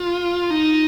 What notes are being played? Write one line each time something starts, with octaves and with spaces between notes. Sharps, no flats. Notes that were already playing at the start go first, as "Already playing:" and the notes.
Already playing: F4
D#4